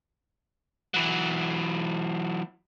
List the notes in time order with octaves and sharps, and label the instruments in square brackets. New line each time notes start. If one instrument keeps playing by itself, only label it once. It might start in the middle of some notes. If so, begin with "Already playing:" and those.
[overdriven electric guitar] E3 F#3